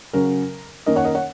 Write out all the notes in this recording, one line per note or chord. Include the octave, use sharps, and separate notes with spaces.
C#3 F#3 C#4 A#4
D#3 A#3 C#4 A#4 D#5
C#5 F#5
A#4 D#5
C#5 F#5